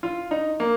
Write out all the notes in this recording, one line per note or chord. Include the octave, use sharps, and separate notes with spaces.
F4
D#4
A#3